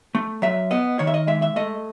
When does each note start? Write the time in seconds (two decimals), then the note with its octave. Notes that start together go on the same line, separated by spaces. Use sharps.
0.15 A3
0.42 F#3 E5
0.71 B3 D#5
0.99 D#3 C#5
1.07 E5
1.14 D#5
1.27 G#3 E5
1.42 E5
1.56 A3 D#5